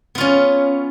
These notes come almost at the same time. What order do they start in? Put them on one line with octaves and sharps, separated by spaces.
B3 F4 C#4